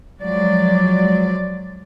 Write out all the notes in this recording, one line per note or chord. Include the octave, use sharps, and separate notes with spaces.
F3 F#3 G#3 D5